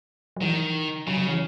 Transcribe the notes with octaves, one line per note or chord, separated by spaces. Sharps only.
F#3
D#3 E3
C#3 F#3
F#3
E3